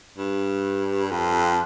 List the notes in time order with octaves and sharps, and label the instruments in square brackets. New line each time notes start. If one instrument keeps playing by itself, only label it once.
[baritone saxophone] G2
F2